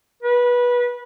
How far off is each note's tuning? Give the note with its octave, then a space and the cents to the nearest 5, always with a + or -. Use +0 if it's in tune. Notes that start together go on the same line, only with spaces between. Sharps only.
B4 -20